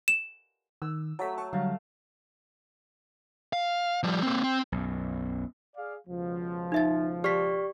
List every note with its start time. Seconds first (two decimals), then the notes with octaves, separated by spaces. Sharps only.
0.08 E7
0.82 D#3 E6
1.19 F#3 A3 A5 A#5 B6
1.38 F#5 A5 C#6
1.53 D3 F#3 G3 F5
3.53 F5
4.03 F3 G3
4.22 A#3 C4
4.43 C4
4.72 B1 F#2
5.76 G#4 D5 F5
6.08 C#2 B2 F3
6.72 D#4 E5 A6
7.24 G4 D5 C#6 F6 B6